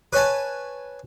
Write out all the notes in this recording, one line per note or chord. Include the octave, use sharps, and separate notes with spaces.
B4 C#5 G#5 A5